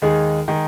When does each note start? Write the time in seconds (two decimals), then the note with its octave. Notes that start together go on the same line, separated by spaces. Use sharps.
0.02 D#2 D#3 G#3 D#4 G#4
0.48 D#3 G#3 D#4 G#4